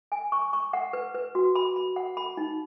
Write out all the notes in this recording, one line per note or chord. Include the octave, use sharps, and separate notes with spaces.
G#5
C#6
C#6
F#5
B4
B4
F#4
B5
B5
F#5
B5
D#4